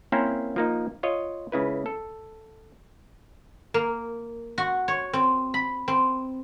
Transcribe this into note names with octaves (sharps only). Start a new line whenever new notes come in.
A#3 C4 C#4 E4 A#4 C5
F3 A#3 D#4
F4 C#5 D#5
C#2 C#3 E4 B4
A4
A#3
F#4
C#5
C4
B5
C4